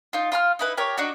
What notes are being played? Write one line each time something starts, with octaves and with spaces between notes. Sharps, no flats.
D#4 F4
F4 C6 F6
D#4 E4 B4
G4 A#4 C#5
D4 D#4 F#4